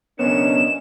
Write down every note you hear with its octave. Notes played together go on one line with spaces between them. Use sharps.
B1 C#3 B3 C#4 D4 A#4 D#5 E7